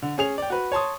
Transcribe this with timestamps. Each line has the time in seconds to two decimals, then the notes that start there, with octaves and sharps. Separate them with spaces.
0.02 D3
0.18 C#4 G#4 F7
0.38 D5 G5
0.50 F#4 B4
0.72 C#5 A5 C6 D#6